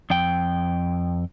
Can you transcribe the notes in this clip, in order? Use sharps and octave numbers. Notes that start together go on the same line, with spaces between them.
F2 G5